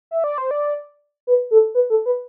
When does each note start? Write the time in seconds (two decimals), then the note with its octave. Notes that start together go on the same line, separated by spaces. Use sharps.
0.11 E5
0.24 D5
0.38 C5
0.51 D5
1.27 B4
1.51 A4
1.75 B4
1.90 A4
2.06 B4